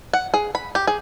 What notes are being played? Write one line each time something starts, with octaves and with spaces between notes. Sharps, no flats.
F#5
G#4
B5
G4
G#4